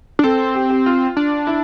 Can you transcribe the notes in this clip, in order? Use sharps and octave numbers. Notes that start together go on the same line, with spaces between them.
D4
C4 A4
G4
G4
F4
D4
E4